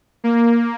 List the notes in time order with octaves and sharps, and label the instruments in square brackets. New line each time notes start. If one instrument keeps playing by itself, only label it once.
[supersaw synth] A#3